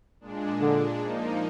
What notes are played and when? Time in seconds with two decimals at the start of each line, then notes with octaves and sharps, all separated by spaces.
0.21 A#2 G#3 D4
0.61 D3
1.00 F3 A#3 D#4